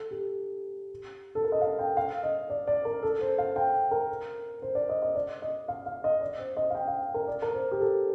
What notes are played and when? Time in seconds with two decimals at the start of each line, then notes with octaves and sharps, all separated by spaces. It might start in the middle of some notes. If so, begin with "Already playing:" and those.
Already playing: A4
0.11 G4
1.35 A4
1.44 A#4
1.52 D#5
1.61 F5
1.79 G5
1.97 F5
2.23 D#5
2.50 D5
2.67 D5
2.85 A#4
3.03 A4
3.21 C5
3.38 F5
3.56 G5
3.91 A#4
4.62 C5
4.75 D5
4.89 D#5
5.02 D#5
5.15 D5
5.42 D#5
5.68 F5
5.86 F5
6.04 D#5
6.21 D5
6.39 C5
6.57 D#5
6.70 F5
6.75 G5
6.87 F5
7.14 A#4
7.27 D5
7.42 A#4
7.54 C5
7.72 G4
7.80 A4